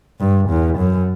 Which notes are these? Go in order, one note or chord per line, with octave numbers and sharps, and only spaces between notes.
G2
E2
F#2